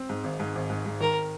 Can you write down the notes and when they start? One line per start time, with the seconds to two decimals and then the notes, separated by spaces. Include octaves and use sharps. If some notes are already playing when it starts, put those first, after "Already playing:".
Already playing: C4
0.09 G#2
0.24 G#1
0.40 G#2
0.55 G#1
0.70 G#2
0.86 G#2
1.00 D#3 A#4